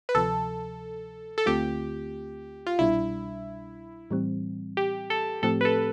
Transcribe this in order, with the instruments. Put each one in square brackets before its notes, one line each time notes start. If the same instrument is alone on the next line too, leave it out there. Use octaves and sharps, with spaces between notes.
[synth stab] B4
[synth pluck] D2 C3 F3 [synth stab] A4
[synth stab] A4
[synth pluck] D2 D3 A3 C4 F4 [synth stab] G4
[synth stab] F4
[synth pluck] C2 B2 G3 D4 [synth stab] E4
[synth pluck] A2 E3 G3 C4
[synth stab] G4
A4
[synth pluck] A2 F3 A3 C4 G4 [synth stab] A4
[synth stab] B4
A4